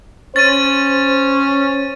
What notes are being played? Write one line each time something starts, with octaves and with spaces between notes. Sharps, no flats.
C#4 C5 A6 D#7